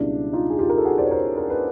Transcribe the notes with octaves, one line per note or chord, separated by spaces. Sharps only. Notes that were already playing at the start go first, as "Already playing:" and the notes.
Already playing: C#2 B2 G3 D4 E4
D#4 F4
G#4
F4 G4
A#4
A4
F#4 G#4
C5 D5
C#5
A#4 C5
A#4
B4